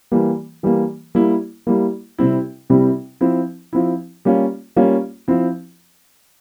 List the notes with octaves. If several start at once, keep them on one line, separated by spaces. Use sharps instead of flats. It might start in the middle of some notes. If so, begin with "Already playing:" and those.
E3 G3 A#3
E3 G3 A#3
G3 A#3 E4
G3 A#3 E4
C3 G3 C4 E4
C3 G3 C4 E4
F3 C4 E4
F3 C4 E4
G3 A#3 C#4 F4
G3 A#3 C#4 F4
F3 C4 E4